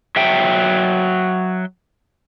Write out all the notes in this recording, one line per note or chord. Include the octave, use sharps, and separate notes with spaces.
F#3 E5 G5